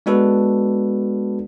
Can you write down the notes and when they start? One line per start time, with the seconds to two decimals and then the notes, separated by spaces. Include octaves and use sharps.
0.06 G#3 B3 D4 F#4 A4 B4